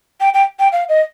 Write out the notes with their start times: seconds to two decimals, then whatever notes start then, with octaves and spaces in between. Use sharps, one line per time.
0.21 G5
0.34 G5
0.59 G5
0.72 F5
0.89 D#5